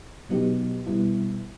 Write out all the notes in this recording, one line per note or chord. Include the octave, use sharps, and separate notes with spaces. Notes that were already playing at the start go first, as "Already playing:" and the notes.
B2 F#3 B3 D#4 G4
B2 G3 B3 E4